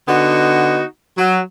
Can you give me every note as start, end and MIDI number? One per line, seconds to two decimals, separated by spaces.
0.08 0.84 50
0.08 0.84 59
0.08 0.84 63
0.08 0.84 66
1.18 1.39 54